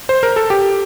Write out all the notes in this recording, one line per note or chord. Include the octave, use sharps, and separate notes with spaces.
C5
A#4
A4
G4